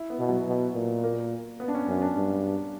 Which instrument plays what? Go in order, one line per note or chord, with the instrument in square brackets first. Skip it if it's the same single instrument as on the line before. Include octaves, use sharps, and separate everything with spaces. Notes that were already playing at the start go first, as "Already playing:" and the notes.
Already playing: [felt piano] E4
B3
[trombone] B2
[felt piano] F#3
[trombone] B2
A#2
[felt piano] A#3
B3
D4
C#4
[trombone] F#2 [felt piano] C#4
[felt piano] D4
[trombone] G2